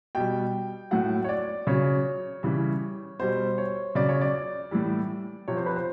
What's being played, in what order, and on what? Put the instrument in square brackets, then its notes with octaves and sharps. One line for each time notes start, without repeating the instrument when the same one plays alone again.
[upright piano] B2 G3 G5
A2 F#3 F#5
C#5
D5
C#3 F#3 C#5
C#3 E3 G3
B2 G3 C5
C#5
C#3 F#3 D5
C#5
D5
A2 E3 G3
C3 F3 C#5
C5
B4
C5